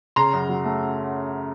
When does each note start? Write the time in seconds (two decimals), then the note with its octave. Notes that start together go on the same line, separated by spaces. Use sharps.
0.16 C#3 A#5 C6
0.33 F#2
0.49 F#3
0.65 A3